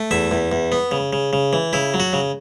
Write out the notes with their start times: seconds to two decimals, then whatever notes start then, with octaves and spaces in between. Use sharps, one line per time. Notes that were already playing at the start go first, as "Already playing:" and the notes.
Already playing: A3
0.11 E2 E5
0.31 E2
0.52 E2
0.72 B3
0.91 C#3
1.13 C#3
1.33 C#3
1.53 E3
1.73 C#3 E4
1.94 F#3
2.00 F#4
2.13 C#3